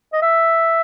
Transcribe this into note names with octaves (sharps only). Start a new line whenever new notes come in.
D#5
E5